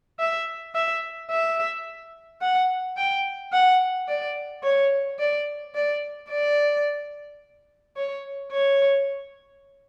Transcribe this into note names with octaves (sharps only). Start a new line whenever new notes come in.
E5
E5
E5
F#5
G5
F#5
D5
C#5
D5
D5
D5
C#5
C#5